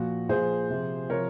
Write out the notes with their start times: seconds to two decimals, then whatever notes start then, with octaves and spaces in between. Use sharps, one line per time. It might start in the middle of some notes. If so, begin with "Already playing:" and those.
Already playing: A#2 F3 F#4
0.29 A#2 F3 G#4 C5
0.70 C3 F3
1.10 C3 F3 A#4 C#5